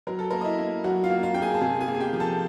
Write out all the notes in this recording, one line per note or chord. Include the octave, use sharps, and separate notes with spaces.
F#3 A#4
A4
A#3 A#4
D#5
E4 E5
A#3
F#3 F#4 F#5
F4 F5
A#3
F4 F5
A#3 G5
G#4 G#5
A5
C3 G#4 G#5
G#4 G#5
A#3
G#5
G4 G5
F3
A4 A5